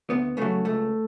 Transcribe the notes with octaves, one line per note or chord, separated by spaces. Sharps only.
D2 B3
C#3 F#3 A3
C#2 A3